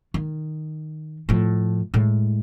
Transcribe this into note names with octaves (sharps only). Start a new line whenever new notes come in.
D#3
A2 F3
A2 G#3